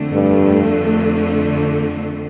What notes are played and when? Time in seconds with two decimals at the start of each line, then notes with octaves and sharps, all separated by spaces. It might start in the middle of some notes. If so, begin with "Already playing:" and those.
Already playing: F2 D3 A3
0.13 G2